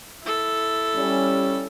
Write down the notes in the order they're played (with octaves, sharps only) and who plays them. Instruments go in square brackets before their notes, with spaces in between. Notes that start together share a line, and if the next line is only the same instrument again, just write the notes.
[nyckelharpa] E4 A4
[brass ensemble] G3 C#4